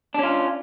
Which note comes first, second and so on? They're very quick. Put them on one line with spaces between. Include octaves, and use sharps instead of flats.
D4 C#4 F4